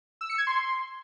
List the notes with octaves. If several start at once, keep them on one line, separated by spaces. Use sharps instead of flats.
E6
C#7
G#6
C6